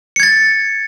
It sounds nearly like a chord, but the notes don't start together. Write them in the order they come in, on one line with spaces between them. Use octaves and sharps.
C#7 G#6 A6